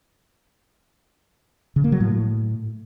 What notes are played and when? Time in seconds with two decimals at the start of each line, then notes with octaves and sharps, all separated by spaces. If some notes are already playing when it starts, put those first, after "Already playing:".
1.76 C#3
1.84 A#3
1.92 F#3
2.00 A2